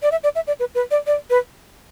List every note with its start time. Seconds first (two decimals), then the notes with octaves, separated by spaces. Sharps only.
0.02 D5
0.11 E5
0.23 D5
0.35 E5
0.47 D5
0.60 B4
0.75 B4
0.91 D5
1.07 D5
1.30 B4